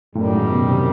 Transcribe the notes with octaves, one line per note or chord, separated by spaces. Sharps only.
F#2 A2 D#3 G3
G#2
B2
C3